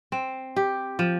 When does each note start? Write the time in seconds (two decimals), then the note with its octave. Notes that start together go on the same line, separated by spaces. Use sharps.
0.12 C4
0.56 G4
0.99 F3